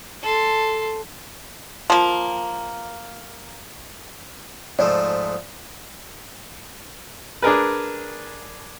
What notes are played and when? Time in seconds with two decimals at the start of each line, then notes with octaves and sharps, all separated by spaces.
0.23 A4 C6
1.90 F3 A#3
4.79 G#2 F3 A3 D5
7.42 D4 G#4 A#4 B4